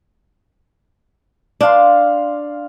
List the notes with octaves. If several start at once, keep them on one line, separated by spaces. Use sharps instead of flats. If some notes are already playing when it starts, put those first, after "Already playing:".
D4 D5 F5 C6